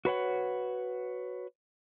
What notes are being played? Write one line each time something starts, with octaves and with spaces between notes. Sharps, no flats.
F#4 B4 C#5 F#5